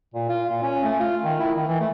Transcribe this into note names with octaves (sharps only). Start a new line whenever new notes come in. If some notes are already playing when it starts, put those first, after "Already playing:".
A#2
F4
A#2
C#4
A3
F4
D#3
E4
D#3
E3
A3